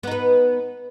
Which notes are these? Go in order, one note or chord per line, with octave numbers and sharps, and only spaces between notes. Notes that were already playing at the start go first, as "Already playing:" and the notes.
B3 D#4 B4